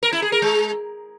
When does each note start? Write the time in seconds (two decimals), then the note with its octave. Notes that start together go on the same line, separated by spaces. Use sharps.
0.03 A#4
0.12 E4
0.22 G#4
0.32 A#4
0.42 G#3